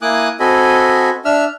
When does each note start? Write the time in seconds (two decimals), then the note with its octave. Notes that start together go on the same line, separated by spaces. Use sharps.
0.02 A#3 E4 G#5 D6 D#6 F#6
0.40 C4 F#4 A4 D#5 G#5 B5
1.25 D4 E5 E6 F6